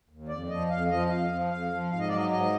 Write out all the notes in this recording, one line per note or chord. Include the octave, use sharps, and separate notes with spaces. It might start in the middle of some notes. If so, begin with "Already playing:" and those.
D#2
F2 D5
F3 D#5
F2 F5
F3 D#5
F2 F5
F3
F2 F5
F3
G#2 F5
D#5
F#3 D5
D#5
G#2 D#5